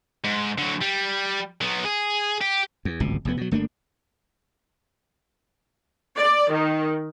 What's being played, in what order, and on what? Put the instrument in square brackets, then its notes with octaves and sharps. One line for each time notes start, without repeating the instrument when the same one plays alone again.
[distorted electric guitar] G#2
D3 F#3
G3
F#3 B3
G#4
G4
[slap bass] E2
D1 G#1 C#2 B2
F1 F2 B3
B2 F#3
G1 A3 A#3 D4
[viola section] D5
D#3